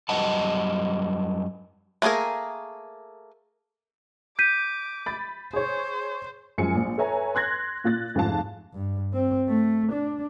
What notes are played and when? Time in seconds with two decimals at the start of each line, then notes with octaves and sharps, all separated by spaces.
0.09 F#2 G3 D#5 F#5 A5
2.02 A3 A#3 F4 G#4 A#4
4.39 D6 G6 B6 D#7
5.06 B5 A6
5.53 G#4 C5 C#5
6.58 F#2 F3 G#3 G#5 C#7
6.75 A#1
6.98 A4 B4 C#5 E5 G#5 A#5
7.35 C6 F#6 G#6 A#6
7.84 A#2 F4 F#6 A6
8.15 F1 G#2 F3 F4 F5 A5
8.74 G2
9.13 C4
9.49 A3
9.92 D4